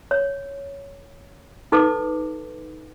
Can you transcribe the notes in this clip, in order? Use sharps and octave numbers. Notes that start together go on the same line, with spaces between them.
C#5
D#4 A4 B4 D6